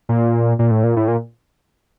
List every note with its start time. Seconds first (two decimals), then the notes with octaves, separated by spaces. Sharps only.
0.09 A#2
0.59 A#2
0.71 A2
0.84 A#2
0.97 A2
1.08 A#2